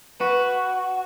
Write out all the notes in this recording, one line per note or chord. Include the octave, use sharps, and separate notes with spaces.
F#4 B4